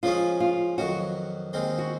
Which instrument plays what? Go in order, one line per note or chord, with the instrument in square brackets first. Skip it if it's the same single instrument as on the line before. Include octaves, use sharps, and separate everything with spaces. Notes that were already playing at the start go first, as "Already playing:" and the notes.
[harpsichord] C#3 F3 G#3 C#4 G#4 [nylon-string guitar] F4
[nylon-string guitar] F4
[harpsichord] F2 D#3 F#3 [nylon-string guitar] F#4
[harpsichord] D#2 D#3 G#3 C4
[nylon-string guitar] F#4